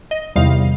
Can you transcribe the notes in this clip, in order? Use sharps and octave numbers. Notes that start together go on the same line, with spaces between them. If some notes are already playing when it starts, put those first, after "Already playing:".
D#5
E2 C3 D#3 G3 F5